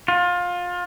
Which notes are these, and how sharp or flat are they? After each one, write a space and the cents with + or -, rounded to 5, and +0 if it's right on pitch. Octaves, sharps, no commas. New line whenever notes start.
F4 +25